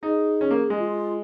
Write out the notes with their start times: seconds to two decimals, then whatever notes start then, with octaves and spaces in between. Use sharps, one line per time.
0.03 D#4 G#4
0.41 C#4
0.51 A#3
0.70 G#3
0.79 F4